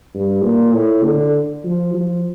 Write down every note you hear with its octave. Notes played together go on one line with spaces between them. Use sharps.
G2
A#2
A2
D3
F3
F3